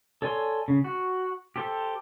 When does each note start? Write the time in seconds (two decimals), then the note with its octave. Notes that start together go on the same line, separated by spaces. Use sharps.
0.22 A4 C#5 D5 G#5 C6
0.68 C#3
0.84 F#4
1.56 G4 A4 C5